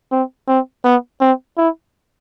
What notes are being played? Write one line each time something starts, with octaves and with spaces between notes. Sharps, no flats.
C4
C4
B3
C4
E4